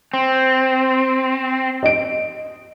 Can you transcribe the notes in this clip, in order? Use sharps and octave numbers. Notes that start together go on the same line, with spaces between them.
C4
D#5 D7